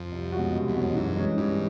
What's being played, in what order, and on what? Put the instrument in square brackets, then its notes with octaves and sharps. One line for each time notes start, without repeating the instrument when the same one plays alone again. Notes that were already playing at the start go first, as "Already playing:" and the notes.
Already playing: [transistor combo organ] F2
[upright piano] C2
B2 G#3 C#4 F#4
C2
[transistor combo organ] E2
[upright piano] B2 G#3 C#4 F#4
[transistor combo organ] F2
[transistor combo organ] F#2 [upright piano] E3
[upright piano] G#3 C#4
[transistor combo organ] G2 [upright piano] E3